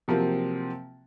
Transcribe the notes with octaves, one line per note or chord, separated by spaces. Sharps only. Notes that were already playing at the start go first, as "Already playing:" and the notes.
C3 F3 F#3 A#3 C4